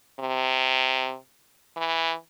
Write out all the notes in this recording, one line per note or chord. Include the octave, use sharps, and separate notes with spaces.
C3
E3